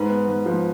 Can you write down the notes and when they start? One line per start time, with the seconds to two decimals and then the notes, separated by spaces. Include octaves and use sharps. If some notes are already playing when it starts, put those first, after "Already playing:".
Already playing: G#2 B4
0.10 B3
0.29 G#2
0.46 F3